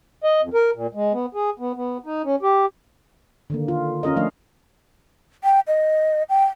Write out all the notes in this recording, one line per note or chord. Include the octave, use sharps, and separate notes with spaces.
D#5
F2
A#4
A#2
G#3
B3
G#4
B3
B3
D#4
C#4
G4
D3 D#3 A#3
F4
C#4 F4 A#4 D#5
F3 A3 D4 F5
G5
D#5
G5